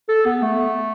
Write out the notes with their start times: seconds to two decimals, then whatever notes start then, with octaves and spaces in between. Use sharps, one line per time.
0.09 A4
0.26 B3
0.43 A3